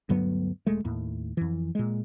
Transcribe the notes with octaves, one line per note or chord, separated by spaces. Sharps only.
D2 G2 F#3 B3
E1 G#3 A3
D#2 A2
F2 E3
A#2 G#3